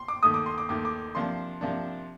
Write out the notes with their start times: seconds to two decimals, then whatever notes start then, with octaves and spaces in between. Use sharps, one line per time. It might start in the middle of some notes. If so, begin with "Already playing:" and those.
Already playing: C6
0.08 D6
0.23 D#2 D#3 A3 D#6
0.34 D6
0.46 C6
0.58 D6
0.69 D#2 D#3 A3 D6
0.85 D6
1.15 C3 F3 A#3 D4 C6
1.61 C3 F3 A#3 D4